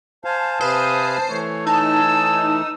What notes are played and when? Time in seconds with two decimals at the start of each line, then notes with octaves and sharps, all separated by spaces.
0.25 C5 F5 G#5 A5
0.61 C3 B4 C5 F5 D#6
1.30 E3 A3 C#5
1.67 D#4 C#5 G#5 A5 E6